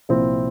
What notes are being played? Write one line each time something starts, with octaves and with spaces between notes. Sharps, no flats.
C2 A#2 F3 C4 E4